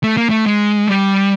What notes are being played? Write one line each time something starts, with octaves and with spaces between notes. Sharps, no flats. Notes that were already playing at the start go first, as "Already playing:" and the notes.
A3
A#3
A3
G#3
G3